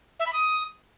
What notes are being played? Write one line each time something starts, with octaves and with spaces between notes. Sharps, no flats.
E5
B5
D#6